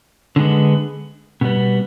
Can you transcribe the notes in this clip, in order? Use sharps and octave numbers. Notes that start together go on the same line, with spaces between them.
D3 G#3 B3
B2 G3 B3